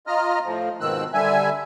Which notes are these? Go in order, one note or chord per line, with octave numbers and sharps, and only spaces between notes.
F4 D#5 A#5 F6
A2 F3
G#2 B2 D#3 C4 E6 F#6
D3 G3 E5 G#5